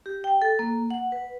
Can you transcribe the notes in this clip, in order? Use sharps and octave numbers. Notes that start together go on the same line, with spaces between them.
G4
G5
A4
A#3
F#5
B4